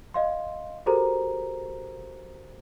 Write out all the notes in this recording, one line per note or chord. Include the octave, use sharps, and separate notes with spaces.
D#5 F5 C6
F#4 G4 A4 A#4 C5 A#5